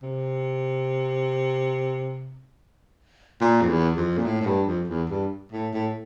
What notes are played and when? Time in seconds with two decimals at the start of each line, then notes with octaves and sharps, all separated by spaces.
0.03 C3
3.41 A#2
3.61 F2
3.69 E2
3.97 F2
4.18 A#2
4.25 A2
4.41 A2
4.46 G2
4.67 F2
4.88 E2
5.10 G2
5.52 A2
5.73 A2